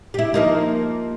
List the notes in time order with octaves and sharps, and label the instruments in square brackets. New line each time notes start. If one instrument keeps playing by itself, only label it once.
[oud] E4 G4
F3 A#3 D#4